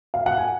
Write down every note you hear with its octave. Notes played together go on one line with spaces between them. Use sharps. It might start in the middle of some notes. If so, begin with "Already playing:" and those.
F5
F#5
G#5